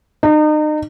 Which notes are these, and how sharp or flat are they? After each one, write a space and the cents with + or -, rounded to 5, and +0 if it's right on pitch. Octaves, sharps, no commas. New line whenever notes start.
D#4 -35